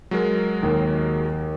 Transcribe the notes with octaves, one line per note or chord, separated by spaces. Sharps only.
F#3 G#3 A#4
D#2